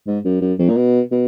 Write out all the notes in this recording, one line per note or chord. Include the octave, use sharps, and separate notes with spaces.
G#2
F#2
F#2
F2
A#2
B2
B2